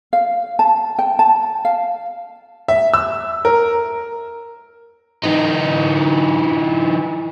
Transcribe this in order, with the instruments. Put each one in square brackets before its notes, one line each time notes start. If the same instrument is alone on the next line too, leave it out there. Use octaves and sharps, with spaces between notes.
[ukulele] F5
A5
G5
A5
F5
[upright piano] E5
E6
A#4
[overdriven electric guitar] E3 D#4